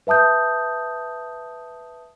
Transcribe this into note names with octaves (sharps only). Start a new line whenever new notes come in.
B4 E5 A5 D#6 G6